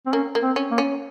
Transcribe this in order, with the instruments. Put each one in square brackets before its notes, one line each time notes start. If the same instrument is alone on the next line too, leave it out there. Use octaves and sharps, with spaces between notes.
[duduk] C4
[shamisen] A#3 [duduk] C#4
[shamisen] A#3
[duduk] C4
[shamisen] C#4
[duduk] A#3
[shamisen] C#4